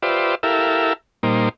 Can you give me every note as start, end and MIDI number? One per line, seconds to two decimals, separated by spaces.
0.02 0.35 65
0.02 0.35 67
0.02 0.35 71
0.02 0.35 72
0.02 0.35 74
0.02 0.35 76
0.43 0.93 64
0.43 0.93 67
0.43 0.93 69
0.43 0.93 70
0.43 0.93 76
0.43 0.93 77
1.23 1.49 46
1.23 1.49 55
1.23 1.49 58
1.23 1.49 63
1.23 1.49 72